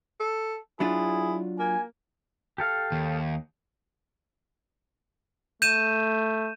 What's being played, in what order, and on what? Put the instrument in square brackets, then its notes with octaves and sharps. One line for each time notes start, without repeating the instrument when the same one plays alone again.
[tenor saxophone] A4
[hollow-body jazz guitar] F#3 D4 F4 [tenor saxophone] E4 [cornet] G#4
[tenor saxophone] A#3 [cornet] G#5
[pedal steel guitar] G4 A4 F5
[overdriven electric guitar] D#2
[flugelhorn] A3 [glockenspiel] G6 D#7 E7